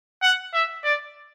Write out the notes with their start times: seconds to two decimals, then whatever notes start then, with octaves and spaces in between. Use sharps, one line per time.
0.23 F#5
0.54 E5
0.84 D5